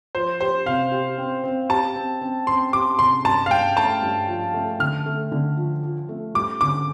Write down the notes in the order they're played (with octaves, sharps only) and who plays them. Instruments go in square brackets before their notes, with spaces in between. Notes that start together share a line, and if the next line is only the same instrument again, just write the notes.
[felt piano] F3 [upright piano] C5
[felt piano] G4 [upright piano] C5
[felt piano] C3 [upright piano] F5
[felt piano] G4
C4
C4
[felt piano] G4 [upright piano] A5
[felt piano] C4
C4
[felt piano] C4 [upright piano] C6
[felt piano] G4 [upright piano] D6
[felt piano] C3 [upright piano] C6
[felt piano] G2 [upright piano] A5
[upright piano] F5
[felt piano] G2 [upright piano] G5
[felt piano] A3 [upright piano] A5
[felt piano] G2
F3
A3
[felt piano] D3 [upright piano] F6
[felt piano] A3
D3
F3
F3
A3
[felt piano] G3 [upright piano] D6
[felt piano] D3 [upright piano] D6